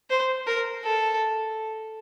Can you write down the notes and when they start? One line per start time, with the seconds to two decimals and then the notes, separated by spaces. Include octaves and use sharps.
0.10 C5
0.47 A#4
0.84 A4